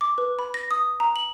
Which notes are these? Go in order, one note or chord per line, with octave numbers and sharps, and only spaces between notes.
D6
B4
B5
A#6
D#6
A#5
F#7